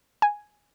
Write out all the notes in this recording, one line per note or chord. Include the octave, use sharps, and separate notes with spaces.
G#5